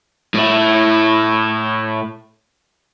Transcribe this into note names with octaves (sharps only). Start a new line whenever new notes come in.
A2 E4